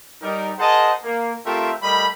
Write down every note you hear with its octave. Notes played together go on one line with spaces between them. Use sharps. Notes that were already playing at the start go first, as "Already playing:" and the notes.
G3 D#4 A#4
G#4 A#4 C5 D#5 F#5 A5
A#3
A3 C4 F4 G4 A#4 E5
G3 A3 A#4 D#5 B5